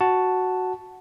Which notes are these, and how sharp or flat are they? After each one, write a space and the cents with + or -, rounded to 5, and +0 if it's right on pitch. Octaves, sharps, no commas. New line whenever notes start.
F#4 +0 F#5 +0 A5 +0